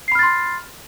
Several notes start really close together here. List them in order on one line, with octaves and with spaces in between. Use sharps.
C7 B5 F6 A6 C6